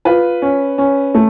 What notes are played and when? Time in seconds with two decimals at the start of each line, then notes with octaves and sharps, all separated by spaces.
0.05 F4 B4
0.42 C#4
0.78 C#4
1.14 A3